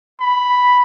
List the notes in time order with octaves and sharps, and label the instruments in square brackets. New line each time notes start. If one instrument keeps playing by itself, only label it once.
[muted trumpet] B5